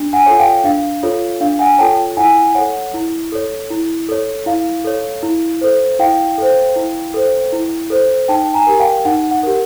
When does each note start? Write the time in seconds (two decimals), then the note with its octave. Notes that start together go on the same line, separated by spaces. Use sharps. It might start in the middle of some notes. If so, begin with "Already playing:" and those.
Already playing: D4
0.13 F#5 G#5
0.26 F4 A4 C#5
0.39 F5 G5
0.64 D4 F5
1.03 F4 A4 C#5
1.41 D4 F5
1.59 F#5 G#5
1.79 F4 A4 C#5 G5 A5
2.17 E4 F#5 G#5
2.55 A4 C#5 F#5
2.94 E4
3.32 A4 C#5
3.70 E4
4.09 A4 C#5
4.46 E4 F5
4.84 A4 C#5
5.23 E4
5.61 A4 C5
5.99 E4 F5 G5
6.38 A4 C5
6.76 E4
7.14 A4 C5
7.53 E4
7.90 A4 C5
8.28 D#4 G5 A5
8.54 G#5 A#5
8.67 G4 A#4
8.80 F5 G5
9.05 D#4 F#5
9.31 F#5
9.43 G4 A#4